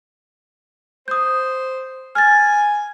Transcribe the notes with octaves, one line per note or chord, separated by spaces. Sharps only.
C5 D#6 G6
G#5 F6 A6